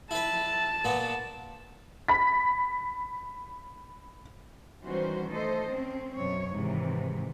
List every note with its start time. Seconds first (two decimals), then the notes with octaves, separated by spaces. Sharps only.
0.11 E4 B4 A5
0.84 A#2 B3
2.08 B5 B6
4.86 D#3 E3 G3 C#4 F#4 C5
5.32 A3 A4 C5 D#5
5.69 C4 C#4
6.17 F#2 B2 C#5
6.53 G#2 C3 D#3 E3